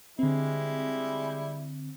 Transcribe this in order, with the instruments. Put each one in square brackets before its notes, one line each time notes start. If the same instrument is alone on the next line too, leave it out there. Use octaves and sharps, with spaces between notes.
[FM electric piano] D3 C4 [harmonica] G3 G#3 E4